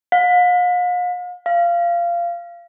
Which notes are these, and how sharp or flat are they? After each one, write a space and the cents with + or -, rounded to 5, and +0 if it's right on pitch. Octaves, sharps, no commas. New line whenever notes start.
F5 +45
F5 -20